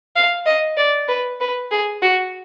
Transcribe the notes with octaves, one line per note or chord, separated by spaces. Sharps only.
F5
D#5
D5
B4
B4
G#4
F#4